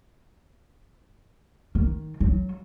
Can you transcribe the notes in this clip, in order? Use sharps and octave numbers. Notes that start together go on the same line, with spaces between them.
D#3
F#3